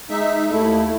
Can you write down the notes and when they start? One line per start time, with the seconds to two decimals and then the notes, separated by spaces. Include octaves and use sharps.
0.10 G#3 D#4 E5
0.51 D#2 A3 E4